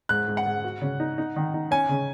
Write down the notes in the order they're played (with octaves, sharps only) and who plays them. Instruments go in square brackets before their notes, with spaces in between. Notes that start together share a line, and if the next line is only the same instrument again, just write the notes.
[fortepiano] G#2 [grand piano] F#6
[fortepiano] G#2
[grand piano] F#5
[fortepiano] G#2
F#4
C#3
D#4
D#4
D#3
D#4
[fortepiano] C#4 [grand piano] G#5
[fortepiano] C#3